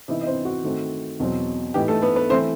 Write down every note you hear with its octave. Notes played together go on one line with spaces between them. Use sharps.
C3 E3 B3 D#4 E4 D#5
D#5
C4 C5
F#4
D#3 A3 C4
E2 B2 F#3 C4
A2 E3 B3 D#4 G4
A3 A4
B3 B4
B3 B4
E3 A3 C4 E4 C5